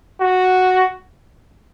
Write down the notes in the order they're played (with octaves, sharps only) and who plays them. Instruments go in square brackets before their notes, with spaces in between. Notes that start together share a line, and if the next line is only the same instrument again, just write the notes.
[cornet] F#4